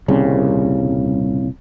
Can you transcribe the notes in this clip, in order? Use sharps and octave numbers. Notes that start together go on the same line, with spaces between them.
D#1 C2 C#3